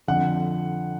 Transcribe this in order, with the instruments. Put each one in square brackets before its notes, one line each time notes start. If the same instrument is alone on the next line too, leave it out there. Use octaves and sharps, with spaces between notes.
[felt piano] F2 D3 F3 [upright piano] F#5